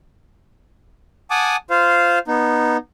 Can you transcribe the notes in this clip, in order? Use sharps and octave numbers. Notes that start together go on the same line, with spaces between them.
F#5 G#5 A5 D6 D#6
F4 C5 F5
B3 D#4